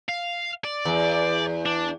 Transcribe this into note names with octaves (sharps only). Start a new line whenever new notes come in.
F5
D5
E2
D4